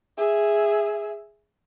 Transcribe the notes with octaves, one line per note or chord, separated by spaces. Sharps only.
G#4 E5